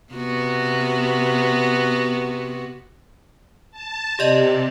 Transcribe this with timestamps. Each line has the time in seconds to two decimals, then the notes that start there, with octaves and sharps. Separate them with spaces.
0.13 C3 B3 F#4
3.71 A5
4.19 C3 G4 D5 D#5